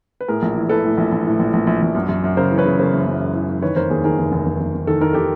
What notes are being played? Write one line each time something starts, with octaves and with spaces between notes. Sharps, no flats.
B4
A2 G#4 A#4
A#1
E3
E3 A4 B4
A2
A#1
A#1
A2
A#1
A#1
A#1
A#1
F#2
F#2
F#2
C#3 A#4 C5
E3
B4 C#5
C#3
C#3 A#4 C5
F#1
F#2
F#2
E3
E3
D#3 B4 C#5
F1 A#4 C5
D#2 G#4 A#4
D#3 G#4 A#4
F1
F1
F1
F1
F1
D#3 A4
D#3 A#4
D#3 G4 A4